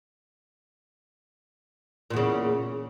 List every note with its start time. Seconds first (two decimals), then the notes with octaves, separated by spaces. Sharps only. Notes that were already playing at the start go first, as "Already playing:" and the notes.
2.10 A#2
2.13 E2
2.17 C#3